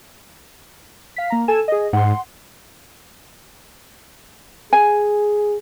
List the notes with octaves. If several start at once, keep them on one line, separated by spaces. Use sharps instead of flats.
F5 B6
A#3 A#5
A4 G#5 E7
G#4 D#5
G#2 F#5 C6
G#4 G#5